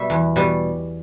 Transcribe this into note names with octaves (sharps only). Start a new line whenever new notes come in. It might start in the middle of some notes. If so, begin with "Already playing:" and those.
Already playing: B2 G3 E5
E2
B2 G3